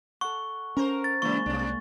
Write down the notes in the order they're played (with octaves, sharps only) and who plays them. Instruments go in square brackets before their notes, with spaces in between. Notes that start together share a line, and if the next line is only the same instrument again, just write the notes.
[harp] A4 F#5 [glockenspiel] C#6
[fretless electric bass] C#4 [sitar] A#4 C5
[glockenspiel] A6
[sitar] C#3 E3 [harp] G#3 A#3 [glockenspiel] C#6
[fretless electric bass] C2 [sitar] C3 D4